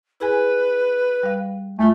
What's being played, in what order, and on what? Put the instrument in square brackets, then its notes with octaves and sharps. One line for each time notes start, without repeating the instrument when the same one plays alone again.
[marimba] E4 G#4 G#5 [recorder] B4
[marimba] G3 F5
[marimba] E2 F4 [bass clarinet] A3